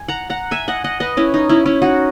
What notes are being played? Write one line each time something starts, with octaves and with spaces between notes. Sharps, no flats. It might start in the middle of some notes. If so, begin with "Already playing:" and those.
Already playing: G#5
F#5 A#5
F#5 A#5
E5 G#5
D#5 F#5
D#5 F#5
B4 D#5
C#4 E4
D#4
C#4 E4
C#4 E4
D#4 F#4